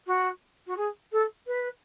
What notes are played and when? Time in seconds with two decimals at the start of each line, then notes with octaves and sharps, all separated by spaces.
0.06 F#4
0.66 F#4
0.76 G#4
1.12 A4
1.47 B4